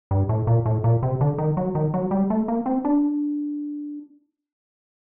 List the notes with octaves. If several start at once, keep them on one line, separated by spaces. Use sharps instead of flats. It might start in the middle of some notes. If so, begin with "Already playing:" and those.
G2
A2
A#2
A2
A#2
C3
D3
D#3
F#3
D#3
F#3
G3
A3
A#3
C4
D4